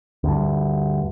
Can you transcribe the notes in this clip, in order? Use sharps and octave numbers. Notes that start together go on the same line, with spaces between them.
D2 G2